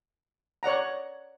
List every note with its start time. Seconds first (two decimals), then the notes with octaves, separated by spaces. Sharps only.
0.63 C#5 D5 F#5 A#5